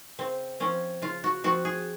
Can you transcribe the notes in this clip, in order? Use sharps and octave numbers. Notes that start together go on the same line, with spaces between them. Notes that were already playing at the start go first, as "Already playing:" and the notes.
C#3 C4
F3 C4 C#4
C#3 F4
F#4
F3 C4 F#4
G#4